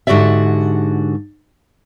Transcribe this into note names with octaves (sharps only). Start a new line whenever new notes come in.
G#2 D3 F#4 G4 D5 E5